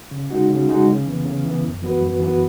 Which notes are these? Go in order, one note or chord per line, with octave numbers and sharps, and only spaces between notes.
C#3
G#3 D#4 F#4
C#3
G#3 D#4 F#4
C#3
E3 B3
C#3
E3 B3
F#2
E3 B3 F#4 B4
F#2
E3 B3 F#4 B4